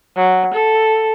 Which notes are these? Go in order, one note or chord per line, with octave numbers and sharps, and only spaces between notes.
F#3
A4